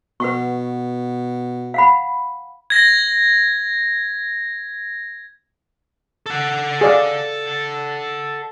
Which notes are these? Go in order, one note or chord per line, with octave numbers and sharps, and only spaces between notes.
B2 B4 F#5 C#6
F5 F#5 B5
G#6 A#6
A4 F#5
G#4 D5 F5